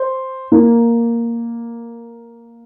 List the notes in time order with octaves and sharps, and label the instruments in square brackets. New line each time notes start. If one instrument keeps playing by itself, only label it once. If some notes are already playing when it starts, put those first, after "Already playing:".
Already playing: [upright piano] C5
A#3